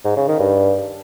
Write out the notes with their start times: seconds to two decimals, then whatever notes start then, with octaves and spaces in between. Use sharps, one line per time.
0.05 G#2
0.16 C#3
0.28 D#3
0.40 G2